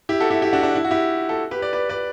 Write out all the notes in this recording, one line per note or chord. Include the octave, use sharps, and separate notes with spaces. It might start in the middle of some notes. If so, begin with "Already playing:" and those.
E4 G4
F#4 A4
E4 G4
E4 G4
D4 F#4
D4
E4
F#4
E4 G4
F#4 A4
G4 B4
B4 D5
B4 D5
B4 D5